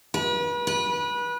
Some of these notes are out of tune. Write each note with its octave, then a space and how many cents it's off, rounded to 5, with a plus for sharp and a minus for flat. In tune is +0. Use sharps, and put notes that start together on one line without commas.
B4 -35
B4 -25